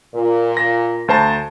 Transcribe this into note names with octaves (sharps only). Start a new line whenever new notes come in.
A#2
A#6
D2 C5 A5